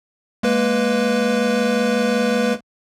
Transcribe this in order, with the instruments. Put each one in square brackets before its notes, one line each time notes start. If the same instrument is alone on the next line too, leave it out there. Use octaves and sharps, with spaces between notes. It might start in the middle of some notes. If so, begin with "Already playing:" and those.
[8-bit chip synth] G#3 A#3 B4